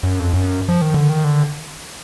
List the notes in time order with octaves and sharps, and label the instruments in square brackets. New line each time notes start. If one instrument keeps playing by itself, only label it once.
[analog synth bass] F#2
F2
F#2
F3
D#3
D3
D#3
D3